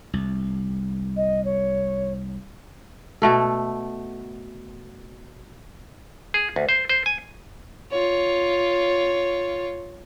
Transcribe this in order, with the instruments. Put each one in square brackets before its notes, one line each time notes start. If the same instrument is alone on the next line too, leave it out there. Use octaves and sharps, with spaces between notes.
[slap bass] C2
[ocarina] D#5
C#5
[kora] B2 A3 A4
[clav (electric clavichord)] G#4
D2
C5
C5
G#5
[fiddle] F4 C#5